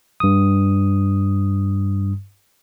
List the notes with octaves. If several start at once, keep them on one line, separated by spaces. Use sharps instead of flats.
G2 D#6